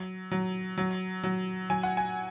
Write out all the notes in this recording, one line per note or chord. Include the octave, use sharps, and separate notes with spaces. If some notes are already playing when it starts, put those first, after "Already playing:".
Already playing: F#3
F#3
F#3
F#3
F#3 G#5
F#5
G#5